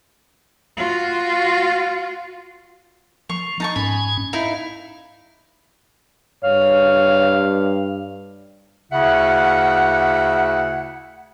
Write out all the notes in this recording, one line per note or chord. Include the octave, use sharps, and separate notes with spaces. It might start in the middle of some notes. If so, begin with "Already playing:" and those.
F4 F#4
F3 C#6
D#4 A5 C#6
G#2 C#4 G#5 B5
D#4 E4 F5
G2 C#5 F5
D2 C#3 E4 E5 F#5